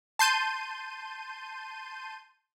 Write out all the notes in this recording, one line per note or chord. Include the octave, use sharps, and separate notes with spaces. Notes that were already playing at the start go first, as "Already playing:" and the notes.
A5 C6 G6 D#7